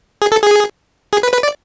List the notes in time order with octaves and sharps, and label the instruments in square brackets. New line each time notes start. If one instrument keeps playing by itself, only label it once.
[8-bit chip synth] G#4
A4
G#4
G#4
B4
B4
D5